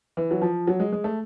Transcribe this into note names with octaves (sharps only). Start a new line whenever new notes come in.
E3
F#3
F3
F#3
G#3
G#3
A3